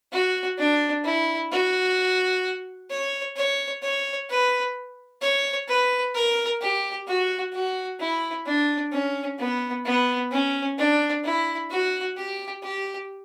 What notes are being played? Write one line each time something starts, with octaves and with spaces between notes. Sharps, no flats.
F#4
D4
E4
F#4
C#5
C#5
C#5
B4
C#5
B4
A#4
G4
F#4
F#4
E4
D4
C#4
B3
B3
C#4
D4
E4
F#4
G4
G4